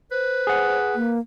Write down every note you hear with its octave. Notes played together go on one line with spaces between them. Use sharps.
B4 C5
G#4 F#5
A#3